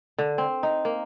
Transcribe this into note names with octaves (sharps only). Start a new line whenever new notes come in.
D3
C4
D#4
A#3